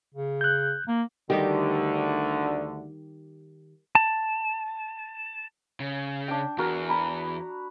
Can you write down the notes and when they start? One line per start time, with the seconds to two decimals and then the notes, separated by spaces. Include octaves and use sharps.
0.14 C#3
0.41 F#6 G6
0.88 A#3
1.30 D2 D3 D#3 G3 D#4 G4
3.95 A5
5.80 C#3
6.28 D4 G5
6.58 E2 F#4 A#4
6.89 A#5 B5